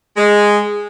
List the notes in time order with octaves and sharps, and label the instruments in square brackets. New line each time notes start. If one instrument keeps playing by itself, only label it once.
[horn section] G#3